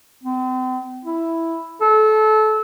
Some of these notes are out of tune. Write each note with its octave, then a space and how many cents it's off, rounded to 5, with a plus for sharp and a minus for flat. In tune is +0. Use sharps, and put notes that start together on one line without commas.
C4 -40
E4 +0
A4 -25